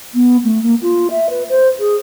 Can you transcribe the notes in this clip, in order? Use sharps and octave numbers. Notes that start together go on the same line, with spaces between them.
B3
A3
A#3
F4
E5
B4
C5
G#4